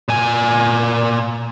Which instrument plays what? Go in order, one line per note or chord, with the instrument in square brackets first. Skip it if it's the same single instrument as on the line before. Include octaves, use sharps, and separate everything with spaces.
[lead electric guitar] A#2 G#5